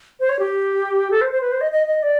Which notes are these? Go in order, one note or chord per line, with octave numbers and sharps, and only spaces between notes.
C5
C#5
G4
A4
C5
C5
B4
C5
D#5
D#5
D#5
D5